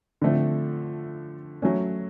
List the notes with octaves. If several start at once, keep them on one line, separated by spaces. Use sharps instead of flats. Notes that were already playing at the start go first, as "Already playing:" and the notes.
D3 F3 A3 C4
F#3 A3 C#4